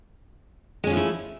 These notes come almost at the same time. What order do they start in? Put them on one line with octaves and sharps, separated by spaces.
G#3 C#4 F3 A3 E4